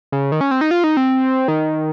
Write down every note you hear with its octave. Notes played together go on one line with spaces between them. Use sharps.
C#3
D#3
C#4
C4
D#4
F4
D#4
C4
D#3